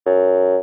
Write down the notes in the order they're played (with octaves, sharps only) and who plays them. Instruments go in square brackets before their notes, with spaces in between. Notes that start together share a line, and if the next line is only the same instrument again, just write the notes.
[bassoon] F#2